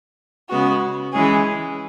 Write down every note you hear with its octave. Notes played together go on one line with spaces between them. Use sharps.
C#3 G#3 B3 F#4
E3 G#3 C#4 G#4